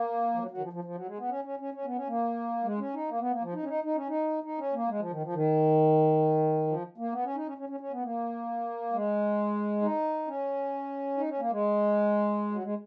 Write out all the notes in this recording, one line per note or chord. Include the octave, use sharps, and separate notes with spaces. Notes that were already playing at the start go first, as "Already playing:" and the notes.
Already playing: A#3
F3
F#3
F#3
D#3
F3
F3
F3
F#3
G#3
B3
C#4
C#4
C#4
C#4
B3
C#4
A#3
G#3
C#4
D#4
A#3
B3
A#3
F3
D#4
C#4
D#4
D#4
C#4
D#4
D#4
C#4
A#3
G#3
F3
D#3
F3
D#3
F3
A#3
B3
C#4
D#4
C#4
C#4
C#4
C#4
B3
A#3
G#3
D#4
C#4
D#4
C#4
A#3
G#3
F#3
G#3